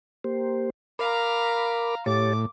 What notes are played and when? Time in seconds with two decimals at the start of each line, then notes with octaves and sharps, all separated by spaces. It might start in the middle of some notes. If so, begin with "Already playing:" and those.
0.24 A#3 G4 C5
0.99 A#4 F5 A#5 B5 D6
2.06 A2 G4 C#5 D6 A6